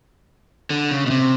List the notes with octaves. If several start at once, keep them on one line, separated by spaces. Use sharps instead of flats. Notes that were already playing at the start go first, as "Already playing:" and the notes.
D3
C#3
B2
C3